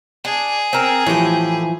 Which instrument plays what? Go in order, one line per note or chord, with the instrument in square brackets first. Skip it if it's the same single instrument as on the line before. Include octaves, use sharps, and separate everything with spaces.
[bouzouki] D4 [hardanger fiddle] G#4
[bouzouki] C4 A#4
[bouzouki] A2 G4 [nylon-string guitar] E3 F3